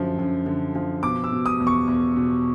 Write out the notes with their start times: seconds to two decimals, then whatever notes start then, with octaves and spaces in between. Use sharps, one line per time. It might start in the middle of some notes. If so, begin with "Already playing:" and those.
Already playing: F#2 D3 F3
0.19 F#2
0.46 D3
0.75 F3
1.03 B2 D6
1.24 E6
1.32 B2
1.46 D#6
1.60 E2
1.67 C#6
1.87 E2
2.16 B2